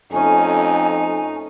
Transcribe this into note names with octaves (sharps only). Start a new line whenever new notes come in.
F2 A3 C#4 D#4 G#5